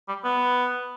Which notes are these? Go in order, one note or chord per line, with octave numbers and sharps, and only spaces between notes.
G3
B3